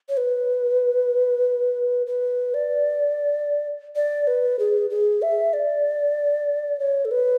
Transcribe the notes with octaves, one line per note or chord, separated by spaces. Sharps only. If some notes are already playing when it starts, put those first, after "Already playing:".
C#5
B4
B4
D5
D5
B4
G#4
G#4
E5
D5
C#5
A4
B4